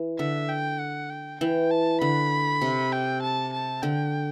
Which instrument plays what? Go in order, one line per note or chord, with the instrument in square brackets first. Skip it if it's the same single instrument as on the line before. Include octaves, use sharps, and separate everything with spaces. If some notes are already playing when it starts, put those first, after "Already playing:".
Already playing: [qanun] E3
[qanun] D3 [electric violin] E5
[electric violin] G5
F#5
G5
[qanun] E3 [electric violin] G5
[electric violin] A5
[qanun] D3 [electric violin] B5
[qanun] C3
[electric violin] G5
A5
A5
[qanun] D3 [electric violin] G5